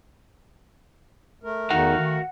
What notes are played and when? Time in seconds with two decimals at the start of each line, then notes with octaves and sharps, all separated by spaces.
1.43 A3 A#4
1.70 E2 D#3 D#4 F#4 F5 F#5
1.98 D#3